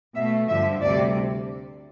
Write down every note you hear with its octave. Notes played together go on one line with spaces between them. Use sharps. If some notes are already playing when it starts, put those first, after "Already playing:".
B2 A3 E5
G2 D3 F3 E5
D2 C3 G3 D5